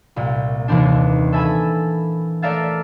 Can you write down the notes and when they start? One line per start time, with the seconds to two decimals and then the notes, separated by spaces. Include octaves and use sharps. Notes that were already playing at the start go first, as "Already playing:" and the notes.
0.16 C2 A#2
0.68 D#2 C3 E3 C4 D4
1.33 A4 E5 G#5 B5
2.42 A3 A#4 D5 E5 F5 A6